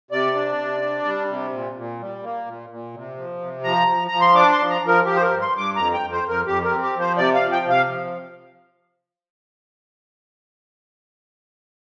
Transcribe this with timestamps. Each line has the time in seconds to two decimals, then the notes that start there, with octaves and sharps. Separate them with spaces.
0.11 C3 D5
0.34 D4
0.58 C3
0.82 D4
1.05 G3
1.28 C3
1.53 A#2
1.76 A#2
1.99 G3
2.23 A#3
2.46 A#2
2.70 A#2
2.94 C3
3.17 F3
3.40 C3
3.64 F3 A#5
3.88 F3
4.08 F3 A#5
4.21 C6
4.34 D4 D6
4.53 C6
4.58 F3
4.70 A#5
4.82 F3
4.88 A#4
5.05 F3 G4
5.16 C5
5.23 A#4
5.29 G2
5.41 C6
5.52 G2
5.58 D6
5.75 F2 A#5
5.94 G5
6.00 F2
6.12 C5
6.23 F2
6.29 A#4
6.47 F2 G4
6.64 A#4
6.70 C4
6.82 G4
6.93 F3
7.00 C5
7.17 C3 D5
7.35 F5
7.41 F3
7.52 G5
7.65 C3 F5
7.88 F3